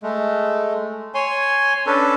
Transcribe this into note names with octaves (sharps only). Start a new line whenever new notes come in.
G#3 A3
C#5 G#5 C6
C#4 D4 A4 B4